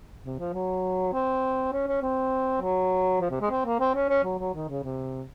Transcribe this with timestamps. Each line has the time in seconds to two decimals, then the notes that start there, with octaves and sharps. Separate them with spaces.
0.24 C3
0.39 F3
0.53 F#3
1.13 C4
1.72 C#4
1.87 C#4
2.02 C4
2.61 F#3
3.21 F3
3.30 C3
3.41 G#3
3.50 C4
3.65 A#3
3.80 C4
3.95 C#4
4.09 C#4
4.24 F#3
4.39 F#3
4.54 D#3
4.69 C#3
4.83 C3